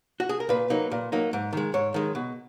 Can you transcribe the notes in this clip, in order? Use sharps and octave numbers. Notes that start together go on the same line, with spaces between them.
F#4
G#4
A#4
A#2 B4
F#3 A#3 D#4
A#2
F#3 A#3 D#4
G#2
D#3 G#3
G#2 C#5
D#3 G#3
B2